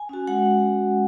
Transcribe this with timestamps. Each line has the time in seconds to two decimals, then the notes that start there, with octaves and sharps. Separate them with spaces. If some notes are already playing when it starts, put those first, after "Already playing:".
Already playing: G#5
0.09 C#4 F#4
0.28 G#3 F#5